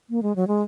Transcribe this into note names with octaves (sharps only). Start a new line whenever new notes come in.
A#3
G#3
F#3
G#3